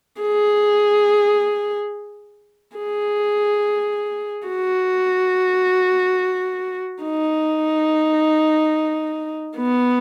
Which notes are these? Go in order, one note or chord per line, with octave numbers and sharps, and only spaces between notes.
G#4
G#4
F#4
D#4
B3